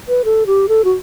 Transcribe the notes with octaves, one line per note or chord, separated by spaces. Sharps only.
B4
A4
G4
A4
F#4